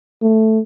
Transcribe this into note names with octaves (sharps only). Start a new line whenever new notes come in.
A3